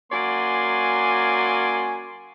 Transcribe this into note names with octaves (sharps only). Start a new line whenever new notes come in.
F#3 A#3 C#4 D5 G#5 C6